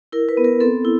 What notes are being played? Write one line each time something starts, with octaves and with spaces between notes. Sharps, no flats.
E4 A#4
B4
B3
A#4
C4 A4
E4